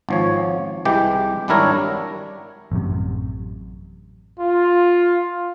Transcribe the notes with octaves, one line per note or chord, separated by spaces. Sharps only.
G#1 F3 C#5
C2 E3 G#3 G4
G#1 G3 D4 E4 A#4 C#5
A1 F#2 C3
F4